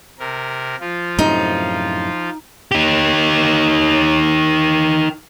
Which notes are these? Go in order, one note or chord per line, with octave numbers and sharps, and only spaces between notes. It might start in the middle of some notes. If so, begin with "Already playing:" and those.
C3 A#4
F3 F4
F#2 A2 C3 D#4
D#4 G4